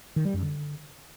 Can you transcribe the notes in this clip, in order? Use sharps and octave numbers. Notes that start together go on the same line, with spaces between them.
D#3
G3
F#2
D3